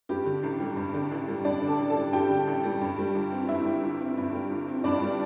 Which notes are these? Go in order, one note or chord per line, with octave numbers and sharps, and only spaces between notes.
G2 G4
D3
A1
G3
G2
D3
A1
G3
G2 D4 D5
D3
A4 A5
A1
A4 A5
G3
G2 G4 G5
D3
A1
G3
G2
G3
G1
C4
G2 E4 E5
G3
G1
C4
G2
G3
G1
C4
G2 D4 D5
G3